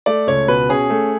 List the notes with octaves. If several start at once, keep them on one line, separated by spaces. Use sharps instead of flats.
A3 D5
C#2 C#5
B2 B4
C#4 G#4
A3